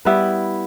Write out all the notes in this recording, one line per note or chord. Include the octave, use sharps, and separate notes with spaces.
G3 B3 E4 B4